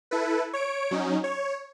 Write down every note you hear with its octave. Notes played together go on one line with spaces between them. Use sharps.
E4 A4 B4
C#5 D7
F#3 C#4 D#4
C#5